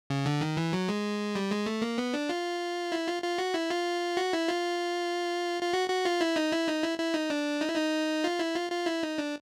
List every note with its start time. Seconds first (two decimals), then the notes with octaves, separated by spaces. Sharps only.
0.10 C#3
0.26 D3
0.41 D#3
0.57 E3
0.73 F#3
0.89 G#3
1.35 G3
1.51 G#3
1.66 A3
1.82 A#3
1.98 B3
2.14 D4
2.29 F4
2.92 E4
3.07 F4
3.23 F4
3.38 F#4
3.54 E4
3.70 F4
4.17 F#4
4.33 E4
4.48 F4
5.63 F4
5.73 F#4
5.90 F#4
6.05 F4
6.21 E4
6.36 D#4
6.52 E4
6.68 D#4
6.83 E4
6.99 E4
7.14 D#4
7.30 D4
7.61 D#4
7.69 E4
7.76 D#4
8.24 F4
8.39 E4
8.55 F4
8.72 F4
8.86 E4
9.03 D#4
9.18 D4